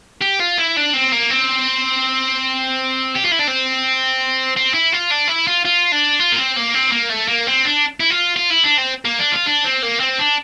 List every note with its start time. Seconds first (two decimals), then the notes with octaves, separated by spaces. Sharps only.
0.22 G4
0.40 F4
0.58 E4
0.76 D4
0.93 C4
1.12 A#3
1.31 C4
3.15 G4
3.24 F4
3.32 E4
3.39 D4
3.47 C4
4.57 C4
4.74 E4
4.93 F4
5.11 D4
5.28 E4
5.47 F4
5.65 F4
5.92 D4
6.20 F4
6.32 A#3
6.38 C4
6.56 A#3
6.75 C4
6.92 A#3
7.10 A3
7.28 A#3
7.47 C4
7.65 D4
8.00 E4
8.10 F4
8.37 F4
8.51 E4
8.64 D4
8.78 C4
9.05 A#3
9.19 D4
9.32 F4
9.46 D4
9.65 C4
9.83 A#3
10.00 C4
10.19 D4